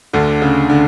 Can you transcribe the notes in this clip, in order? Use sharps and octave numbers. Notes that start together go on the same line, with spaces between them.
D2 D3
C#3
D3